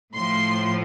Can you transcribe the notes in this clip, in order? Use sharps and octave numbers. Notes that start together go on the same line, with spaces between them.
A2 F3 C6